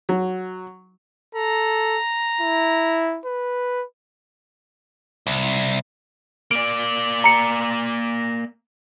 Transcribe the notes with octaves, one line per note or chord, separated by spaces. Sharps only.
F#3
A4 A#5
E4
B4
C2
A#3 D5 D7
A#5 C#7